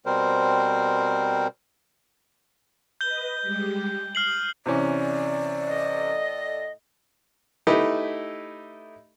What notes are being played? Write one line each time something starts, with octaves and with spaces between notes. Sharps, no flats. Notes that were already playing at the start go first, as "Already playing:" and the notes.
B2 G3 C4 A#4 C5
B4 D#5 G6 G7
G3 G#3 G4
D#6 F6 C7 F#7
C3 E3 C#4 D5
A2 A4 D#5
A3 D#4 E4 G4 B4